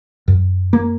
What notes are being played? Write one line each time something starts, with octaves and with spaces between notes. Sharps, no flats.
F#2
A#3